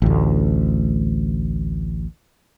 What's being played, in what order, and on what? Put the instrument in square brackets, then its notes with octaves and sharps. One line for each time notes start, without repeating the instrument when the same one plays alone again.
[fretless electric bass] A1 D2